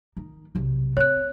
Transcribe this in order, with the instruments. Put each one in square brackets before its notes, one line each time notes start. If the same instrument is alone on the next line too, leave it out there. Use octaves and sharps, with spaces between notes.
[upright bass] D#3
B1 C3
[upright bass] C4 [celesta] C#5 F#6